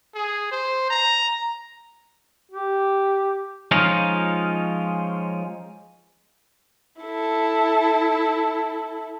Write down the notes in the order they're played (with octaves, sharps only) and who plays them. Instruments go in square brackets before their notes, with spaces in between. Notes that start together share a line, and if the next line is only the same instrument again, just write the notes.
[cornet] G#4
C5
A#5
[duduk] G4
[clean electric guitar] F3 G#3 C#4 D#4 F4
[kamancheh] E4 A4